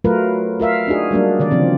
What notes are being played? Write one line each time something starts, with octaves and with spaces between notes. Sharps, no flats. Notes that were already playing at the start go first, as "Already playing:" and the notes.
F#3 A3 F4 A#4 B4
F4 A#4 E5 F5
D4 D#4 F#4 G#4
F#3 G3 A#3 D4
D3 D#3 D5
C#3 F3 C4